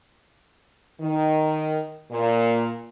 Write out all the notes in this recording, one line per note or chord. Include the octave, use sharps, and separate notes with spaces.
D#3
A#2